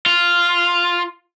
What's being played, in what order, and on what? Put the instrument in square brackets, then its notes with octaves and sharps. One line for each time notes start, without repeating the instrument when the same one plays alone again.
[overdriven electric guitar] F4